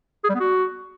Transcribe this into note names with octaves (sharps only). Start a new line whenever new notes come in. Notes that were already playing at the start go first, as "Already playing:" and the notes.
G#4
G3
B3
F#4